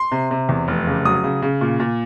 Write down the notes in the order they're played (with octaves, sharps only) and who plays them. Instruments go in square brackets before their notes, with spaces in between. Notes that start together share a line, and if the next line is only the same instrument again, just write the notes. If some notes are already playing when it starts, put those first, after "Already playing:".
Already playing: [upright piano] C6
C3
C3
E2
F1
C#3
F#3 D#6
C#3
C#3
A#2
A#2